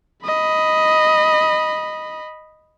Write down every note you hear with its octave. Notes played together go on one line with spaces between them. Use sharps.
D#5 B5